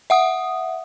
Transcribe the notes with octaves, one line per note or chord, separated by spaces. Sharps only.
E5 F#5 D#6